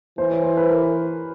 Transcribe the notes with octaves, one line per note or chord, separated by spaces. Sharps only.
E3 C5
C#5
C5
B4
A#4